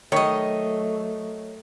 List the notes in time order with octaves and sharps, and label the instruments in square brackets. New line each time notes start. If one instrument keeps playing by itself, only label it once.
[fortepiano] D#3 C#6 [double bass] F#3 A3 [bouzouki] C#5 D#5